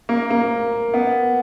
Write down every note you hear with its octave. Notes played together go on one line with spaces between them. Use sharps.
A#3
A#3
B3